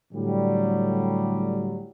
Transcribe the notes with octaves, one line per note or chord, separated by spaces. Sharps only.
A2 D3 F#3 G3